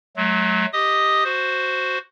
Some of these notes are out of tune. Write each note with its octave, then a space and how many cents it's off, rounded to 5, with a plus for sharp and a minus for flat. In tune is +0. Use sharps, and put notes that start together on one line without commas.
F#3 +0 A3 -40
G4 +0 D#5 +0 D#6 +0
F#4 +0 C5 +0